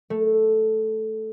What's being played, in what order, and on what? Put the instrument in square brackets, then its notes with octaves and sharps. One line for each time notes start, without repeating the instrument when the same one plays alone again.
[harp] A3